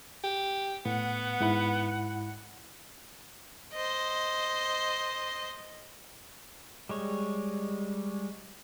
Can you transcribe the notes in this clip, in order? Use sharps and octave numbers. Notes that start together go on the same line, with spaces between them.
G4
A2 B3 F#5
G#2 E4 B5
C5 D#5
G3 G#3 C#5